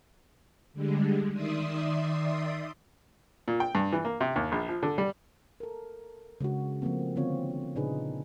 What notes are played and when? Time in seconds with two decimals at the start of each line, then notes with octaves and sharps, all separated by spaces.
0.73 D3 G3 G#3
1.33 D#3 D5 E5 C6 D#6
3.48 A#2
3.60 G5
3.75 G2
3.93 E3
4.05 A#3
4.21 C3
4.36 D#2
4.52 A#1
4.69 F3
4.83 D3
4.98 G3
5.60 A4 A#4
6.41 C#3 G#3 D4 F#4
6.82 F3 A3 A#3 C4
7.16 D3 D#3 B3 C4 F4 C#5
7.75 A#2 C#3 D4 D#4 G#4 B4